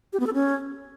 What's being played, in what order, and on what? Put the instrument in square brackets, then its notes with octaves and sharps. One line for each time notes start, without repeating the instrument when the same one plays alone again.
[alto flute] G4
B3
A4
C#4